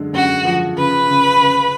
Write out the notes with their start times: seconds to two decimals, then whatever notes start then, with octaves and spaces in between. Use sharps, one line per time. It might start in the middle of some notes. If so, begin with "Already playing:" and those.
Already playing: F#2 D3 G#3
0.13 F#2 F#4
0.45 F3
0.76 C#3 B4
1.07 C#3
1.38 C#3